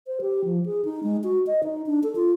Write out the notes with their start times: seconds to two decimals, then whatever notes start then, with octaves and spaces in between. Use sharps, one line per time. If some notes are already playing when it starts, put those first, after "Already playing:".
0.07 C5
0.21 G4
0.45 F3
0.66 G#4
0.85 D#4
1.03 G#3
1.24 F#4
1.47 D#5
1.63 D#4
1.86 D4
2.03 A4
2.16 F4